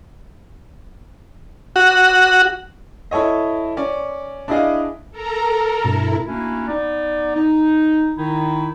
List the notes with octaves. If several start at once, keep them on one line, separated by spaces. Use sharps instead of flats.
F#4
E4 A4 C#5 D#5
C#4 D5
D4 E4 G#4 D5 D#5 F5
A4 A#4 A#5
G2 B2 E4
A3 A#3 C#4 D4 E4 F#4
B3 D#4 D5
D#4
D#3 D#4 E4